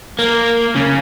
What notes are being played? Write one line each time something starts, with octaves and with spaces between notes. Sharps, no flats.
A#3
C#3